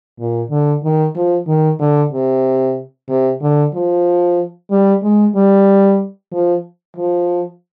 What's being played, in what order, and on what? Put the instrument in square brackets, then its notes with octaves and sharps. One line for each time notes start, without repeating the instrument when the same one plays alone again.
[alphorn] A#2
D3
D#3
F3
D#3
D3
C3
C3
D3
F3
G3
G#3
G3
F3
F3